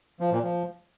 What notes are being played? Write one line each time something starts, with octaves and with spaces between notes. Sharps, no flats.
F3
A#2
F3